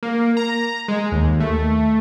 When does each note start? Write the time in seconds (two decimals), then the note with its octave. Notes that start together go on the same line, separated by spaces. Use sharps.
0.03 A#3
0.37 A#5
0.88 G#3
1.12 D#2
1.40 A3